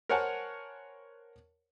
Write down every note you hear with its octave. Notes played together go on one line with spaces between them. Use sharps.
A#4 C5 C#5 F#5 G#5 A5